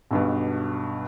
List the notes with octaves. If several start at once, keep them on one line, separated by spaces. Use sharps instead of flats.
B1 G2 B2